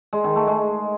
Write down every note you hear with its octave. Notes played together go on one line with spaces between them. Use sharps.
G#3
D#3
A3
G#3